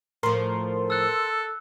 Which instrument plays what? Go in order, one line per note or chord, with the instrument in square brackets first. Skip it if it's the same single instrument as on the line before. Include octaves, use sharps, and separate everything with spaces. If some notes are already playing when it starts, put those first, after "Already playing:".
[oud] A2 F3 [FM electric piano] A#4 C6
[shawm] A4 [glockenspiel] E6 F#6